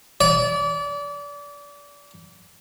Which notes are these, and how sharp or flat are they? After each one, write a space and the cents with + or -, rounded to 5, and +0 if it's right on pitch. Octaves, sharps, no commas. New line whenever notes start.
D5 -30